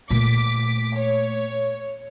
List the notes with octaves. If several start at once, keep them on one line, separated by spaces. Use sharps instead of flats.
A#2 A3 D6 B6
C#5